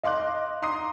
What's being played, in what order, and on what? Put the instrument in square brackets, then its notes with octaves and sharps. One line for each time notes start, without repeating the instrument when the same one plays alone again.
[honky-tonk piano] D#5 F5 C6 D6 F#6
A#5 C6 D6 D#6 C7